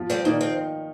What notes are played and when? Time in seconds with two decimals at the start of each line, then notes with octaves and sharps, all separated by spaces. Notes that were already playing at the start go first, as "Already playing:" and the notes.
Already playing: F3 F4
0.10 G3 C4
0.25 A#2 D#3 D#4
0.41 C4